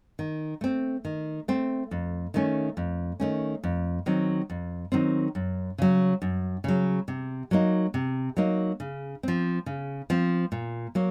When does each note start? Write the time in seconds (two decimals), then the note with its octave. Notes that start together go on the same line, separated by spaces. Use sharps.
0.19 D#3
0.61 A3 C4
1.05 D#3
1.48 A3 C4
1.91 F2
2.34 D#3 A3 C#4
2.77 F2
3.20 D#3 A3 C#4
3.64 F2
4.06 D#3 F#3 C4
4.50 F2
4.92 D#3 F#3 C4
5.35 F#2
5.78 C#3 F#3
6.22 F#2
6.64 C#3 F#3
7.08 C3
7.51 F#3 A#3 D#4
7.94 C3
8.37 F#3 A#3 D#4
8.80 C#3
9.23 F3 C4
9.66 C#3
10.10 F3 C4
10.52 A#2
10.95 F#3 A#3